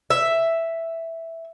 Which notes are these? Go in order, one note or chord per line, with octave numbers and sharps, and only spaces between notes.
E5